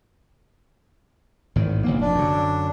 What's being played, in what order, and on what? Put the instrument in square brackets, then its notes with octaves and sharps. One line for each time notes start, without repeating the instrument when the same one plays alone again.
[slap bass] G#1 A2 D#3
F#1 B1 A#3
[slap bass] F1 [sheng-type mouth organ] D4
[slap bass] F#2 D3